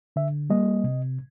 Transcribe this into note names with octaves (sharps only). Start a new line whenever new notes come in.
D3 E5
G3 A#3 D#5
C3